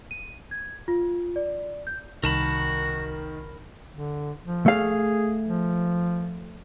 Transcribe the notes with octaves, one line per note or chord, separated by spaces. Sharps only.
D#7
G#6
F4
D5
G6
C2 D#3 F#4 A#4 A5 B5
D3
F3
A3 G#4 F5
F3